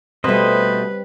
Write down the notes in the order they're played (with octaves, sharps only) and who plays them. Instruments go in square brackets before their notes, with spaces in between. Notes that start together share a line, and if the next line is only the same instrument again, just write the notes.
[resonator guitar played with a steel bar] B2 A3 [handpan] G3 C4 [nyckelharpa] B4 [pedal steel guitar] C5 D#5